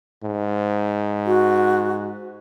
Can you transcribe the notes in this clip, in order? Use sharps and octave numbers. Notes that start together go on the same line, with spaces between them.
G#2
F#4